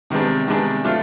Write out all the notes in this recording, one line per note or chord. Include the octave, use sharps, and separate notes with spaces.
C3 D#3 G#3 B3 D4
C3 D#3 G#3 B3 D4
F#3 A3 D4 F4